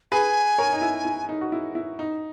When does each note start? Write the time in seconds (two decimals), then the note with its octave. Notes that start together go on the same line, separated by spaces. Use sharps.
0.12 G#4 B4 G#5
0.58 A#4 C#5
0.73 D#4
0.82 E4
1.05 E4
1.29 D#4
1.41 F#4
1.52 E4
1.75 E4
1.99 D#4